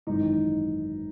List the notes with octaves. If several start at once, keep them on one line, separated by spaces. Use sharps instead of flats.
G#1 F#2 E3 D#4